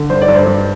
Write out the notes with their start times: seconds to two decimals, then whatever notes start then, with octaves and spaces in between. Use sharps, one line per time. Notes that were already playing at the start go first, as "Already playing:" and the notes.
Already playing: D3
0.10 G2 C5
0.21 D5
0.28 G2
0.34 C5
0.46 G2